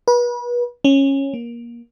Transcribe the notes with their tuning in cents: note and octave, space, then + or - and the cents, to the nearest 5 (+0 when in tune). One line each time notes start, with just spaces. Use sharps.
B4 -35
C#4 -15
A#3 +20